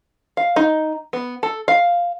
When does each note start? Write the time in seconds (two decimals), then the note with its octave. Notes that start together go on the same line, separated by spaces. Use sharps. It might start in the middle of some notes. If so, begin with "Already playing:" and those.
0.37 F5
0.56 D#4
1.13 B3
1.43 A4
1.68 F5